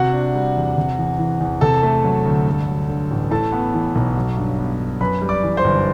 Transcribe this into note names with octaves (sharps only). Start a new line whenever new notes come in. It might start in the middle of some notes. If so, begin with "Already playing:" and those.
Already playing: C3 F#4 F#5
D4
G3
E2
C3
E2
E3
E2
C3 A4 A5
A3
F#3
D2
G2
F#3
D3
A1
A2 A4 A5
B3
E3
B1
F#3
G2
B3
G2
F#2 B4 B5
G3
D5 D6
E3
C5 C6
G1